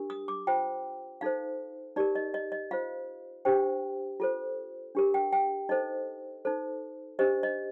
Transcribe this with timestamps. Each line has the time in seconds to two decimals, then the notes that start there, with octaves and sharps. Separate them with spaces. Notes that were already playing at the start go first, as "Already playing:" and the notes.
Already playing: D4 G4 A#4
0.10 D#6
0.28 D6
0.47 F4 C5 G5
1.21 D#4 A4 C5 F5
1.96 D#4 G4 A#4 D5
2.15 D#5
2.34 D#5
2.52 D#5
2.71 F4 C5 F5
3.45 D4 G4 C5 G5
4.20 F4 A4 C5
4.95 D4 G4 A#4
5.14 G5
5.33 G5
5.69 D#4 A4 C5 D#5
6.45 D#4 A4 C5
7.19 D4 G4 C5 D#5
7.43 D#5